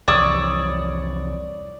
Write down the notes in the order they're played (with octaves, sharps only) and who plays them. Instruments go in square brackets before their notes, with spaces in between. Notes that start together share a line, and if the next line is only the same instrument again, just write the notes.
[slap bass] C2 F2 E3 [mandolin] C#5 D#6 E6 [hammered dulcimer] D5